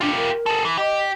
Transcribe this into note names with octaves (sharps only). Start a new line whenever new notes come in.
D4 F4 G4
A#4
G#4 A4
E3
G4 D#5